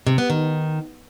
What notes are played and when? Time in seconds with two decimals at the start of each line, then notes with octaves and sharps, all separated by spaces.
0.07 C3
0.18 B3
0.30 D#3